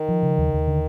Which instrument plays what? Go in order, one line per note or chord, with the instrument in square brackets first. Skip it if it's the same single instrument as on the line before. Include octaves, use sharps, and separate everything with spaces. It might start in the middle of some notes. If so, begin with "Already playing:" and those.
Already playing: [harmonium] D#3
[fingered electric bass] F3
C#3
D#2
D#2
D3